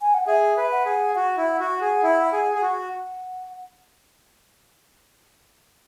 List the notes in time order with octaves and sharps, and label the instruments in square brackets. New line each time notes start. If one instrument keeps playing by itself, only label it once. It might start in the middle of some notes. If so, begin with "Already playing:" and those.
[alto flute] G#5
F#5
[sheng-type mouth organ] G#4 [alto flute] E5
[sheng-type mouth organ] B4
[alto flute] F#5
[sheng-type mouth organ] G#4
[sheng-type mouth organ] F#4 [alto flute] F#5
[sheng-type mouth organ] E4
F#4
G#4
E4
G#4
G#4
F#4